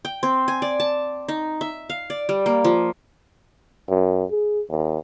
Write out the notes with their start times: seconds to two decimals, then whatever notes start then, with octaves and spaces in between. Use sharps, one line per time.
0.05 G5
0.23 C4
0.48 G#5
0.62 D5
0.80 A5
1.28 D#4
1.61 E5
1.89 F5
2.10 D5
2.29 G3
2.46 A#3
2.64 F3
3.89 F#2
4.31 G#4
4.70 D#2